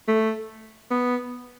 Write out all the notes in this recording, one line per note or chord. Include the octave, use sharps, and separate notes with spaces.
A3
B3